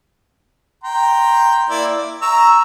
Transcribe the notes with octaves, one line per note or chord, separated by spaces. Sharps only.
G5 A#5 C6
A#3 E4 D5
D5
A#5 C#6 E6